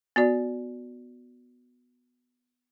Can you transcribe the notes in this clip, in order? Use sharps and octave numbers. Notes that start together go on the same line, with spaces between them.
B3 F#4 D5